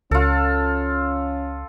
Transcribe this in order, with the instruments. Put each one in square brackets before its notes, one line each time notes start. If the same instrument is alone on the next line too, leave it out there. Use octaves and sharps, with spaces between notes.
[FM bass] C#2 [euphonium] C#4 [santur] F4 A4